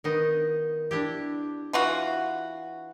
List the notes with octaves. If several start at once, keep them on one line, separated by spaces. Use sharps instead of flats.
D#3 B3 D#4
D4 E4 G4
E3 F4 F#4